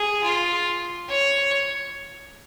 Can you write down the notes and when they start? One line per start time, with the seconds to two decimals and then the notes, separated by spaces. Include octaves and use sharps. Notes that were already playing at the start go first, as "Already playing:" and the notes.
Already playing: G#4
0.24 F4
1.09 C#5